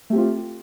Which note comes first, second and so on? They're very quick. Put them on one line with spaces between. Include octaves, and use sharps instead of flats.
A3 G4 C4 F4